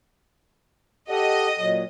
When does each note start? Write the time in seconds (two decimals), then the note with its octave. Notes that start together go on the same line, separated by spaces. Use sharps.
1.10 G4 A4 D#5 F#5
1.59 A#2 F#3